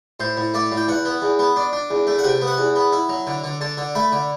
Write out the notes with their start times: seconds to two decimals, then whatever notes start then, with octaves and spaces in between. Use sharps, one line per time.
0.20 A2 C5
0.37 A2
0.54 A2 D5
0.72 A2
0.77 G5
0.88 E2 F#5
1.05 B3
1.22 E2
1.39 B3
1.56 D4
1.73 D4
1.90 E2
2.07 A3
2.18 F#5
2.24 C3 G5
2.41 B3
2.47 F#5
2.58 E2
2.76 B3
2.92 E4
3.09 F#3
3.27 D3
3.44 D3
3.61 D3 A5
3.77 D3
3.95 A3 B5
4.12 D3